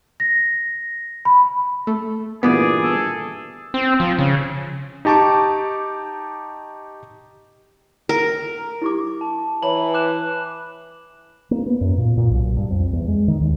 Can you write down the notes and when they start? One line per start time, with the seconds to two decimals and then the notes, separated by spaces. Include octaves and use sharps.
0.20 A#6
1.25 B5
1.87 A3
2.43 G2 A#2 E3 B3 G#4 D5
2.83 A4
3.74 C4
4.00 F3
4.19 C#3
5.05 D#4 G4 A5 C#6 D6
8.09 A#4
8.82 E4 G4 D6
9.21 A5
9.63 E3 C#5 A#5 B5 F#7
9.94 D6 F#6 E7
11.51 A#3
11.66 B3
11.81 F#2
11.98 A#2
12.17 A#2
12.30 B1
12.57 G2
12.70 F2
12.93 E2
13.08 G#3
13.28 D#3
13.41 D#2